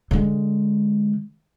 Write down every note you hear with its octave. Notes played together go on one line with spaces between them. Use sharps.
D3 G#3